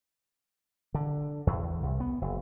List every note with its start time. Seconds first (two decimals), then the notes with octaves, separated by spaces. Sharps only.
0.94 D3
1.47 E2
1.83 C2
2.00 B3
2.21 F#1